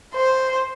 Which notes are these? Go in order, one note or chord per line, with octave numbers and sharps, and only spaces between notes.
C5